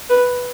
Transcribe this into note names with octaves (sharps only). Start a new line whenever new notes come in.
B4